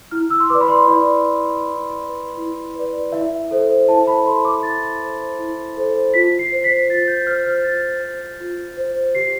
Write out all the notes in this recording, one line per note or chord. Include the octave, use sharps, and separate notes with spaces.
E4 F6
E6
C6
B4 D5 D6
B5
C6
E4 D5
B4 D5
E4
B4 D5
E4
B4 D5
E4 E5
A4 C5
E4 A5
B5
A4 C5 C6
D6
E4 A6
A4 C5
E4
A4 C5
F4 B6
C7
C5
B6
F4 A6
G6
C5 F6
F6
F4 A6
C5
F4
C5
G4 C7